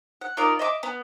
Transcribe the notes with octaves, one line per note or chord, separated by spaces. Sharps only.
F#5
D#4 F4 A#4 D5
D#5 E5 C#6 D6
B3